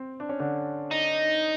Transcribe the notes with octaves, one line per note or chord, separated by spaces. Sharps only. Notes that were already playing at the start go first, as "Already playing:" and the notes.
Already playing: C4
D4
C#4
D3 D4
D#4